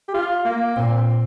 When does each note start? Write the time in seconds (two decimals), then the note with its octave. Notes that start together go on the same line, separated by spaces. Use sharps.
0.08 G4
0.14 F4
0.45 A#3
0.76 A#2 C4
0.96 C4